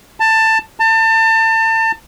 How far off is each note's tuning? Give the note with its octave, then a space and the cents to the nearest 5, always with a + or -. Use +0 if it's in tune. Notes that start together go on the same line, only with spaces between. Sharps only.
A5 +15
A5 +30